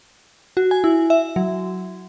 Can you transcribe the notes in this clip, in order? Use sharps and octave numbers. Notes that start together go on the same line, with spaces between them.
F#4
G#5
E4
E5
F#3